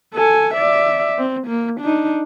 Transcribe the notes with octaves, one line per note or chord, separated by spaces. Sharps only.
A4 G#5
D5 E5
C4
A#3
D4 D#4